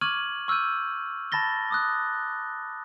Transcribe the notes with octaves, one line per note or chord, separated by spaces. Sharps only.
C#6 D6 F6 G#6 D#7 F#7
C#6 E6 F6 G6 D#7
A5 B5 A6 A#6 G7
D6 D#6 F#6